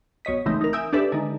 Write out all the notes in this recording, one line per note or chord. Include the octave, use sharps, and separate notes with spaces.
B1 C#5 D#5 B6
G#1 C#3 E3 A3 C4 D#4
D#4 A#4
E5 G#5 D#6 E6 G6 D7
D4 G4 A4 B4 D5 E5
D3 D#3 G#3 D#4